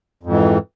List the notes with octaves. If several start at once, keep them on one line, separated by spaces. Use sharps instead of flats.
F2 G#2 E3